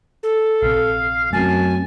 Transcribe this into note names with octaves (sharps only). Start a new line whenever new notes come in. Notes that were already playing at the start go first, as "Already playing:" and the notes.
A4
A#1 C3 F5
F#2 A3 C4 G#5 A5